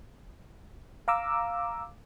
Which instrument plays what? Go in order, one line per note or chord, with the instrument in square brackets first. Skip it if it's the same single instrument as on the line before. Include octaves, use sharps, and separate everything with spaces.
[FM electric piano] F5 A#5 D6 E6